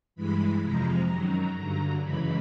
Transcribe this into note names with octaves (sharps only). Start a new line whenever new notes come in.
G2 E3 G#3 B5
F2 C3 F3 G#3 A#5
F#2 D#3 F#3
G2 D3 F#3
F#2 C#3 E3 G#3 B5